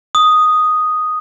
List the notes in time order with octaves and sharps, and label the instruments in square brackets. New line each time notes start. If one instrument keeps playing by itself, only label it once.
[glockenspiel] D#6